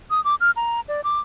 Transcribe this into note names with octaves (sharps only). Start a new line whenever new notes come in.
D#6
D6
F6
A#5
D5
D6